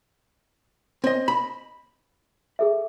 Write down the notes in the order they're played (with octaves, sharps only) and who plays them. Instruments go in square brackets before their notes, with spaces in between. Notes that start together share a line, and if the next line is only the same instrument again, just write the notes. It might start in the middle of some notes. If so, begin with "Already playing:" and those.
[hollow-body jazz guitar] C4 D#5
B5
[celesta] G#4 A4 E5